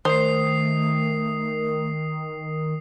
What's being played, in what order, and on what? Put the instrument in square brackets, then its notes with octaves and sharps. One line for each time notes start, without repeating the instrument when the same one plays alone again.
[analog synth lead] D#3 [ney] A3 [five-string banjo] C5 [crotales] D#6 C7